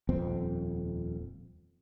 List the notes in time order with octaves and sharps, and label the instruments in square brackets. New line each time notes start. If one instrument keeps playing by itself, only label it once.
[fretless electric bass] D#1 F2 C4